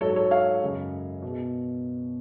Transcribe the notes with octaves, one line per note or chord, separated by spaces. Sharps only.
G#2 F#3 A4 C#5
A4 C#5
C#5 F5
F#2 C#3 G#3
B2